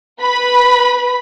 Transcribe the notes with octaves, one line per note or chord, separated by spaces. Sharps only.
B4 B5